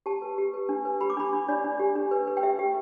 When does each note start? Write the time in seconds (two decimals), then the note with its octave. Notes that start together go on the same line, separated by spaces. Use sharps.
0.06 G4 A5
0.22 B4
0.38 G4
0.54 B4
0.69 D4
0.85 B4
1.01 G4 B5
1.10 D6
1.17 D4 B5
1.33 D4
1.48 D4 D5
1.64 D4
1.79 G4
1.96 D4
2.11 B4
2.27 B4
2.37 G5
2.43 G4 E5
2.59 G4